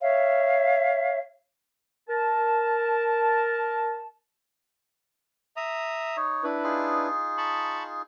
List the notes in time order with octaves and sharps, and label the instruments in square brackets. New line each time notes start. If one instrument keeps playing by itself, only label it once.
[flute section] C#5 E5 F5
[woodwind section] A#4 A5
[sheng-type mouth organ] E5 A#5 D#6
[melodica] D#4 C#5
[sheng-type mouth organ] D4 E4 B4
[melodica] D#4 F4 G#4
[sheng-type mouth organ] A5 B5 C#6